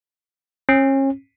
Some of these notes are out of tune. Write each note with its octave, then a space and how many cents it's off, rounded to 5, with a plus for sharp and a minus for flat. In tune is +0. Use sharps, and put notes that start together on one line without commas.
C#4 -35